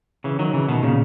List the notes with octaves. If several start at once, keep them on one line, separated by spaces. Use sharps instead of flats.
C#3 E3
D#3 F#3
C#3 E3
B2 D#3
A#2 C#3